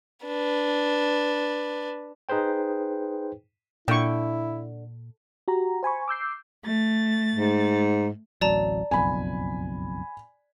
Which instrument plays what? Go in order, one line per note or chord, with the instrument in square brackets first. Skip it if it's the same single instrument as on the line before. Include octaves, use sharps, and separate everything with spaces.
[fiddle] D4 B4
[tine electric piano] D#4 G#4 B4 C5 G5
[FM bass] A#2 [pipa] D3 [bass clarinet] E4 [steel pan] G5 C#6
[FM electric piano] F#4 G4 A#5
C5 G#5 B5 C#6
D6 E6 G6 C7
[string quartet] A3 A6
[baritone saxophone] G#2
[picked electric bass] D1 A1 F#3 [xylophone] D5 A5 A#5
[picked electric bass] F#1 B1 F2 [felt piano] G#5 B5